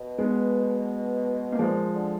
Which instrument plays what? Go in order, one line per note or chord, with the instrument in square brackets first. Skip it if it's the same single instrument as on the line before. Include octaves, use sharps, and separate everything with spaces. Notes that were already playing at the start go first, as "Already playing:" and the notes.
Already playing: [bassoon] B2
[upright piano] G#3 B3
A#3
[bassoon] A#2 [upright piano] F3 G#3
[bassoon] D3